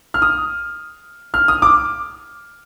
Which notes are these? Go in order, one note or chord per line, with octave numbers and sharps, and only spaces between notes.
F6
D#6
F6
D#6
D6